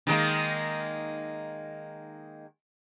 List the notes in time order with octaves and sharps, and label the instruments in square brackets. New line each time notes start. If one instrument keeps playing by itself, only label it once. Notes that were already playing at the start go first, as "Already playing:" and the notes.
[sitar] D#3 G#3 A#3